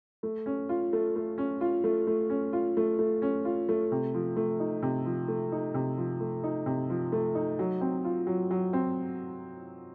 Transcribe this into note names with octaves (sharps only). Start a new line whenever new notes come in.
A3
C#4
F4
A3
A3
C#4
F4
A3
A3
C#4
F4
A3
A3
C#4
F4
A3
C3
F3
A3
D#4
C3
F3
A3
D#4
C3
F3
A3
D#4
C3
F3
A3
D#4
F#3
C4
F4
F#3
F#3
C4